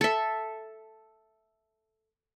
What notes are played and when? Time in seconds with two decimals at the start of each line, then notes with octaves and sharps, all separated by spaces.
0.01 A4 E5